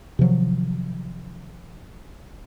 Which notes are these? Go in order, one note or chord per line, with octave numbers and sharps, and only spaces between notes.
C3 D#3 F3 F#3